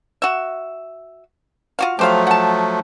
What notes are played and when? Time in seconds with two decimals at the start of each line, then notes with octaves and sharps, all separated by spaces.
0.22 F#4 E5
1.79 F4 F#4 F5
1.99 F3 F#3 A3 G4 C5 F5
2.27 F#5 A5